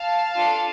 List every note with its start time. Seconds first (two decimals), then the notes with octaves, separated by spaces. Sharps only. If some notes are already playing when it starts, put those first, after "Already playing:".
Already playing: F5 A5
0.36 D4 F4 A4